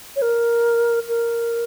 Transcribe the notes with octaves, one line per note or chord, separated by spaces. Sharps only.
C#5
A#4
A#4